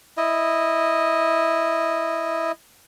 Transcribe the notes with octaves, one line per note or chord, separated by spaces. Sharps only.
E4 D#5